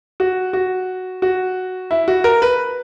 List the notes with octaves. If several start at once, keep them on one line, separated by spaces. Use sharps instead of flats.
F#4
F#4
F#4
E4
F#4
A#4
B4